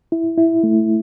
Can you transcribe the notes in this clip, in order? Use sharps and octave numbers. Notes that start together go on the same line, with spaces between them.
E4
E4
A3